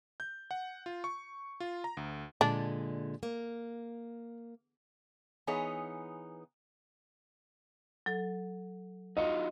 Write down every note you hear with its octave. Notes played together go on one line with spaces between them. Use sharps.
G6
F#5
F4
C#6
F4
A#5
D2
A#2 D3 G#3 D4
A#3
E3 B3 D#4 G#4 C#5
F#3 A4
D#4 F4 F#4 D#5